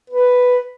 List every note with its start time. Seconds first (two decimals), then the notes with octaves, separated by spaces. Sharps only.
0.10 B4